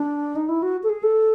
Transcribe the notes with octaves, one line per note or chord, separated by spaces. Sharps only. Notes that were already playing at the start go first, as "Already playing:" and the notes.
Already playing: D4
D#4
E4
F#4
A4
G#4
A4